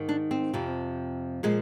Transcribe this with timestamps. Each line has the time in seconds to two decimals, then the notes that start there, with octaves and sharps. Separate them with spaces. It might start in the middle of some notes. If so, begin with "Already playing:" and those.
Already playing: G#2 D#3
0.09 D4
0.31 C4
0.54 F2 C3 F3
1.43 A#2 F3 G#3